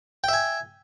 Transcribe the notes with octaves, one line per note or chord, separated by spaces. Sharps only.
E5 G5 G#5